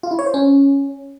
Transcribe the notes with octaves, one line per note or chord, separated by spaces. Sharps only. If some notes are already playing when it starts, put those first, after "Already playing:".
F4
E4
C#5
C5
C#4